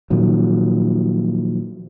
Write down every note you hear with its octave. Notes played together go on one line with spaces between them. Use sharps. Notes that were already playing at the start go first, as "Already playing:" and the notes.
A#2 D#3 F3 F#3